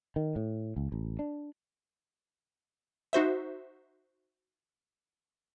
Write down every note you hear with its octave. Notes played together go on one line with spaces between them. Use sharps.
D#3
A2
C#2
A1
D4
D#4 F#4 C5 E5